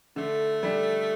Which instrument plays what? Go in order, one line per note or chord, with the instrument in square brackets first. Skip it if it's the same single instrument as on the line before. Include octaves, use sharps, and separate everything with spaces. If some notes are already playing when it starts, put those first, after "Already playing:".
[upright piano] D3 [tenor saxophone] A3
[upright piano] G3 D4